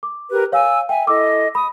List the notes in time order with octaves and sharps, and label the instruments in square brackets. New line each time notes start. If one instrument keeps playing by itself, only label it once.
[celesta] D6
[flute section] G4 A#4 B4
[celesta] C#5 F5 [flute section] G#5 E6
[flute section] E5 G#5 [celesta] G5
[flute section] E4 A4 D#5 [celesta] D6 E6
[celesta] B5 [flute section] D#6